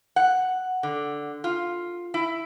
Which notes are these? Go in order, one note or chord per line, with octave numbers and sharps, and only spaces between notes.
F#5
D3
F4
E4